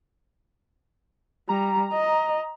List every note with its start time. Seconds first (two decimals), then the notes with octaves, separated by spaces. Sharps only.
1.49 G3 A#5
1.93 D#5